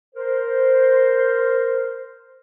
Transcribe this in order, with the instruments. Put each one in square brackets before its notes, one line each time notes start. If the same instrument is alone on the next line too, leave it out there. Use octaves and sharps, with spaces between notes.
[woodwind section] A#4 C5